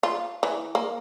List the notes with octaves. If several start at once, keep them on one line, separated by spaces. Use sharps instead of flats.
F4
E3
A#3